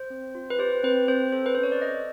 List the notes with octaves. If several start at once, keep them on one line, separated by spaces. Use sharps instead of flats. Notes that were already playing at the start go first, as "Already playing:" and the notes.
Already playing: C5
C4
F4
B4
G4 C5
C4 B4
C4 C5
A4 C5
B4
C#4 C5
C#5
D5
A4 D#5